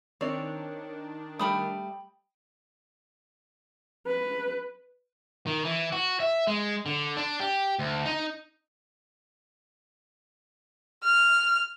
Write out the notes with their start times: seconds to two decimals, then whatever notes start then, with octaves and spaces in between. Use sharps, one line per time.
0.21 D#3 C4 D4 C#5 D5
1.39 G3 A3 G5 B5 D#6
4.07 B4
5.47 D#3
5.65 E3
5.92 F#4
6.20 E5
6.47 G#3
6.86 D3
7.17 D4
7.40 G4
7.79 D2
8.05 D#4
11.04 F6